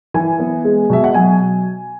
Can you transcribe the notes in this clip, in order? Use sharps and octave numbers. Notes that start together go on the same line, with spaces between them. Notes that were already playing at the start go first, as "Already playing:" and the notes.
E3 G#5
B3
G#3
B2 E5
F#5
F#3 G#5